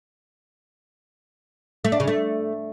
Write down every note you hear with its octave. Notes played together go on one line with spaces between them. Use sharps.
A3
D4
C#3
A3